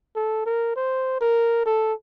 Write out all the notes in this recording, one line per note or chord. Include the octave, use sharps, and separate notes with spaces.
A4
A#4
C5
A#4
A4